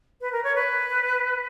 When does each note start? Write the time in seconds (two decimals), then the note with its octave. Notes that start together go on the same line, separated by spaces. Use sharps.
0.21 B4
0.32 A#4
0.44 C#5
0.55 B4